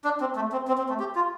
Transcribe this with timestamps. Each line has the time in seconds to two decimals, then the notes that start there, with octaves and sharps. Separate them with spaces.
0.04 D4
0.21 C4
0.36 A3
0.52 C4
0.68 C4
0.78 C4
0.89 A3
1.00 G4
1.15 F4